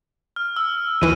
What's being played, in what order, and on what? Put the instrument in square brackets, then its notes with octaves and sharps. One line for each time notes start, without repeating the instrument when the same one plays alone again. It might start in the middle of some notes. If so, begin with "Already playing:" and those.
[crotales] F6
E6
[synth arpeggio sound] D#2 E3 [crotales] D#7